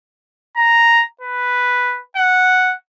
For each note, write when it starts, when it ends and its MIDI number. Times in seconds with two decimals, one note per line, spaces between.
0.57 1.04 82
1.21 2.00 71
2.17 2.75 78